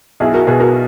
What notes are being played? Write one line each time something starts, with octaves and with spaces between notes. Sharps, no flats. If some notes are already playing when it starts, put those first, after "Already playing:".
B1 E4 G#4
F#4 A#4
B2 G#4 B4
F#4 A#4